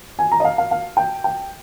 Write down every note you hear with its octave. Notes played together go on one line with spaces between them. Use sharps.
G#5
A#5
D#5
F5
F5
F5
G5
G5